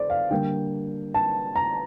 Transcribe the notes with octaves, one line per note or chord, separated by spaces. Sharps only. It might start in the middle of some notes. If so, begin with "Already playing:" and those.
Already playing: A4 C5 D5
F5
D3 G3 A#3 G5
A5
A#5